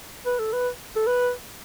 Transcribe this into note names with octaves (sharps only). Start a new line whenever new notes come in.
B4
A4
B4
A4
B4